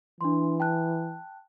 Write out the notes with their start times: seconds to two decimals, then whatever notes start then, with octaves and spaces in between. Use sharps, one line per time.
0.21 E3 D4 C6
0.60 G5 A5 F#6